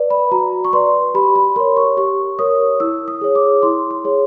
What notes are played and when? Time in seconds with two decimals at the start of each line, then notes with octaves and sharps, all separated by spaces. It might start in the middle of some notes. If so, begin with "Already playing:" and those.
Already playing: B4 D5
0.10 B5
0.32 F#4 A#5
0.65 C#6
0.73 B4 D5 C6
1.14 G4 B5
1.36 B5
1.56 A#4 C#5 C6
1.77 C#6
1.97 G4 C#6
2.39 A#4 C#5 D#6
2.80 E4 E6
3.08 D#6
3.21 G#4 C#5
3.35 D6
3.63 E4 C6
3.91 C6
4.05 G#4 C#5